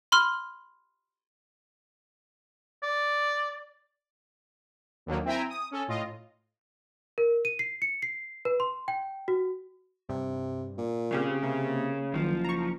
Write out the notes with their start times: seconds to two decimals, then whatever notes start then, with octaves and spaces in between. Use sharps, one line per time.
0.12 B5 C6 F6
2.83 D5
5.06 D#2 D3 D#3 F#3 A#3
5.25 C4 E4 E5 G5 G#5 A#5
5.49 D#6
5.71 C#4 A4
5.88 A2 F4 D#5
7.18 A#4
7.45 D#7
7.59 C7
7.82 C#7
8.02 C7
8.45 B4
8.60 C6
8.88 G5
9.28 F#4
10.09 G2 C3
10.78 A#2
11.12 C#3 C4 G4 G#4 F5
11.43 C3 A#3
12.14 F#1 D#3 F3 F#3
12.45 A#5 C#6